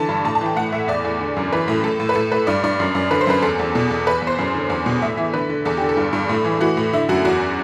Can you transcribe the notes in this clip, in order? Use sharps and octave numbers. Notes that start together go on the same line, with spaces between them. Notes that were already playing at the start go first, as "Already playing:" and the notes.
Already playing: D3 E3 A5
G2
A2 A5
A5
E3 G5
A2 F#5
A2 E5
E2 D5
E2
D3
F#2
E3 B4
A2
A2 A4
A2
B4
A2 A4
A2 B4
G2 D5
G2 D5
F#2
F#2
D3 B4
C5
F#2 B4
E2 A4
E2
B2 A4
E2
E2 B4
E2
C5
F#2
D3
E2
B2
A2 E5
E3
D3 B4
D3
E2 A4
D3 G4
A4
G2
G2
A2
E3
E3 F#4
A2
D3 E4
F#2 F#4
E2 F#4